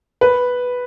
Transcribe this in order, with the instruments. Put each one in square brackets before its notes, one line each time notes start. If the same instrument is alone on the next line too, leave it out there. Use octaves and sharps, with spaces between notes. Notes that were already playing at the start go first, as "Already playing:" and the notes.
[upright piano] B4